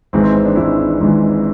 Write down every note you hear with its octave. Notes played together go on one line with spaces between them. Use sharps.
G#1 G#2 E3 C4
C4
C4
D4
G#1 G#2 E3 E4
G#1 G#2 E3